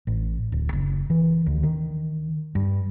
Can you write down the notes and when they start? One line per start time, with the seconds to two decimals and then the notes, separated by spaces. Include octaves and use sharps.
0.07 A1
0.52 D1
0.73 F#1
1.10 E3
1.46 D2
1.63 D#3
2.55 G2